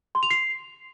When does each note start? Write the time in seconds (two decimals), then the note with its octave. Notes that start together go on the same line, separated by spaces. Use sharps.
0.15 C6
0.23 F7
0.31 C7